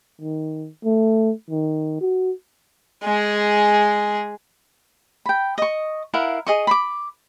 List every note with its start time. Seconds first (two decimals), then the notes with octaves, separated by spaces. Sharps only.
0.21 D#3
0.84 A3
1.50 D#3
2.01 F#4
3.03 G#3 G#4
5.26 G5 B5
5.58 D#5 C#6
6.14 E4 A#4 F5 F#5
6.47 G#4 D#5 C#6
6.67 B5 C6 D6